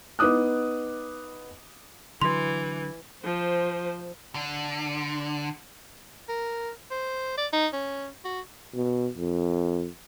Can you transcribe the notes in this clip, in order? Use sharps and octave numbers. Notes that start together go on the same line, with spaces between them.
B3 D#4 D6 D#6 F#6
D3 E3 F#3 C6
F3 C5
D3
A#4
C5
D5
D#4
C#4
F#4
B2
F2